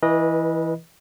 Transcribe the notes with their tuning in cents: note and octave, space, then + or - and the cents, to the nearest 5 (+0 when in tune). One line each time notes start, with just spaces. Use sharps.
E3 +0 B4 -30 D#5 +0